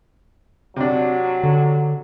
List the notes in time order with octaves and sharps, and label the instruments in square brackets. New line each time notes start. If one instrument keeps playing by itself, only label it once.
[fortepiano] C3 D4 [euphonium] F#3
[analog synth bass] D3